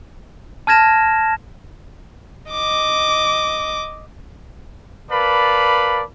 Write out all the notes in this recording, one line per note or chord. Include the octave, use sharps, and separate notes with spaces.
A5 F6 G#6 A#6 E7
D#5 D6
A#4 B4 D5 F5 A5 B5